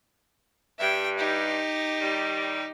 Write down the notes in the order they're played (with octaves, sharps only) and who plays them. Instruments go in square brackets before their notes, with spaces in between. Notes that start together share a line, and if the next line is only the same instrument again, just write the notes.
[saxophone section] G2 [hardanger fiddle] E5 G5
[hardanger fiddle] D#4 G4
[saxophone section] D#3 G3